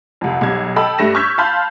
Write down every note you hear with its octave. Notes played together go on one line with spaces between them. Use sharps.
C2 F2
B1 G3 G#6
A4 D#5 G5 A5 B5 E6
G2 G3 A3 A#6 E7
C#6 E6 F6 G6 G#6 B6
F5 A5 B5 C6 F6 G6